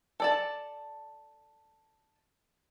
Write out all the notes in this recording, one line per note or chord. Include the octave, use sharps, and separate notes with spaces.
A4 D5 A5